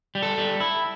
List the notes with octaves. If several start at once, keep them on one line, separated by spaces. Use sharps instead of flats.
G3
A4
G3
E4